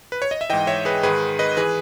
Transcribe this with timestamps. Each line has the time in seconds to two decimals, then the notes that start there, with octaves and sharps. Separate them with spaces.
0.12 B4
0.22 C#5
0.31 D#5
0.41 E5
0.50 G#2 E3 D#5 G5
0.67 C#5 E5
0.85 G#4 B4
1.03 G#2 D#3 G#4 B4
1.39 B4 D#5
1.57 E3 G#4 B4